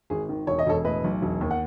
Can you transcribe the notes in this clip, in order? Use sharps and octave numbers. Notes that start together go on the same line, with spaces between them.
G#1 G#4
D#3
E1 C#5
D#5
E1 A4 C#5
A2 B4 D#5
B1
E1
D#2
F#5